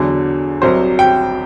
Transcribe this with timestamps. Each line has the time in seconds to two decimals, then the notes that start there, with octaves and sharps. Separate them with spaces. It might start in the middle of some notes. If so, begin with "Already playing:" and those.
Already playing: E2 D3 F#3
0.62 C2 C3 F#3 C5
0.99 G5